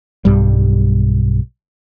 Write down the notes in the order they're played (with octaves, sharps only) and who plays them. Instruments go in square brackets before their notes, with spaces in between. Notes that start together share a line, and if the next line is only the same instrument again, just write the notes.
[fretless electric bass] B1 G2 G3